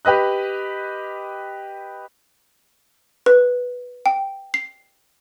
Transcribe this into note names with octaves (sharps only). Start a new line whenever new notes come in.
G4 B4 D#5 F#6
B4
G5
C7